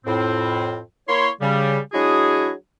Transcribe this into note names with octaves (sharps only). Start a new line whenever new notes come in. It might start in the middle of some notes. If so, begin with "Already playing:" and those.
F2 A2 C4
A#3 E4 C#5 C6
C#3 G3
F#3 G#3 D4 E4 F#4 G#4